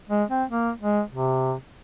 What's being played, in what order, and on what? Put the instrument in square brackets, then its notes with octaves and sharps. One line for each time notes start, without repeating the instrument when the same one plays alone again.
[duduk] G#3
C4
A#3
G#3
C3